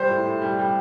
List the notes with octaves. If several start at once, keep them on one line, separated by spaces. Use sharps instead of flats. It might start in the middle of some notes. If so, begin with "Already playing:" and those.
Already playing: G3 C5
A2
A2
G3
G3